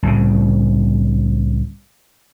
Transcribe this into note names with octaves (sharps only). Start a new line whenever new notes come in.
C2 A2 C#3